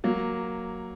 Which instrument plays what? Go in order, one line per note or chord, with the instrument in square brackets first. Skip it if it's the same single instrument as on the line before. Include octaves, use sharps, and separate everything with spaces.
[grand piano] F#3 A#3